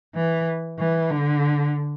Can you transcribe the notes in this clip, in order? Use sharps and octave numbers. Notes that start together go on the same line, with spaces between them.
E3
E3
D3